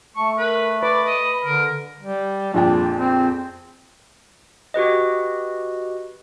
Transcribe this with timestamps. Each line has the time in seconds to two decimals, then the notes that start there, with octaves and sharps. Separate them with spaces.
0.16 A3 A5 C#6
0.38 A#4 B4
0.83 B4 D5 B5
1.06 D#5
1.45 D3 A#4
2.01 G3
2.54 A#1 F2 D4 G5
2.99 C4
4.74 F#4 G4 B4 D#5